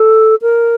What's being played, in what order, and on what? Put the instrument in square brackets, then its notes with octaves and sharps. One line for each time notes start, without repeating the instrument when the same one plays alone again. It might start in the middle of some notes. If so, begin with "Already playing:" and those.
Already playing: [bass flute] A4
A#4